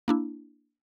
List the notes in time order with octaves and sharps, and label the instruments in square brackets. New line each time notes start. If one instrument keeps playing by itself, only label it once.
[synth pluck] A#3 D4 E4